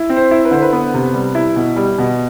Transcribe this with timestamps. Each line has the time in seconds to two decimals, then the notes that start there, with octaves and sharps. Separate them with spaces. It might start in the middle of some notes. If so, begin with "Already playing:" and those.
Already playing: E4
0.09 C4
0.17 C5
0.31 E4
0.45 B4
0.51 D3 C5
0.62 B4
0.72 B3
0.94 C3
1.14 G3
1.35 E4
1.56 B2
1.76 G3
1.98 B2